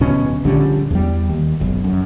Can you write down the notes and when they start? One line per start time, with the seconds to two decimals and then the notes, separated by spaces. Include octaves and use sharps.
0.01 D1 B2 C#4
0.44 A#1 D3 G3 C#4
0.91 E2 G3
1.29 D#2
1.60 F#1 B1
1.84 F#2